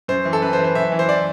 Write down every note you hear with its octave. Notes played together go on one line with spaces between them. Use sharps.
F#2 C5
E3
A4
F#2 B4
C5
E3
C5
F#2 E5
E3
C5
D5